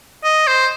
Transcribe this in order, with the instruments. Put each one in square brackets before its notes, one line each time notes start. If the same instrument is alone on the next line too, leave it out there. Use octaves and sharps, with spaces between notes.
[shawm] D#5
C5